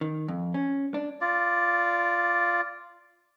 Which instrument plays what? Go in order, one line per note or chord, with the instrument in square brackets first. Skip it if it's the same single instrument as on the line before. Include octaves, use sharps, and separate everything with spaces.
[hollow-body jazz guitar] D#3
F2
C#4
D4
[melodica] F4 D5